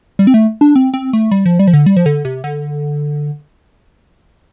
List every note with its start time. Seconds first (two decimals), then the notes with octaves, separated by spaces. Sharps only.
0.19 G3
0.27 C4
0.34 A3
0.61 D4
0.75 C4
0.94 C4
1.13 A3
1.31 G3
1.46 F3
1.59 G3
1.67 F3
1.73 D3
1.86 G3
1.96 F3
2.06 D3
2.25 C3
2.44 D3